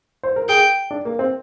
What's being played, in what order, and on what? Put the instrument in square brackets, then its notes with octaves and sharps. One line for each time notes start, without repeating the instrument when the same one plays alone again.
[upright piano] C5
A#4
[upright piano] G#4 [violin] G5
[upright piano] D4
A#3
C4